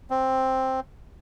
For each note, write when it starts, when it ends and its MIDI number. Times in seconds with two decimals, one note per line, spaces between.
0.10 0.80 60